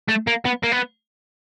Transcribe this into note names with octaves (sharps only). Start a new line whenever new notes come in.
A3
A#3
B3
A#3
B3